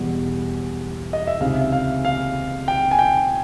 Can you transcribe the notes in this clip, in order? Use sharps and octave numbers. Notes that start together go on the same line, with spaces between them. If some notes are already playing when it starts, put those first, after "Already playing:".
Already playing: E2 B2 G3
D#5
E5
C#2 C3 D#3 F5
E5
F5
F5
G5
G#5
G5